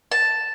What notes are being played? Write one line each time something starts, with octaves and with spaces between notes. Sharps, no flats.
A5